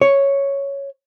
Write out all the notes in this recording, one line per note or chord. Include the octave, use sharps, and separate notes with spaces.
C#5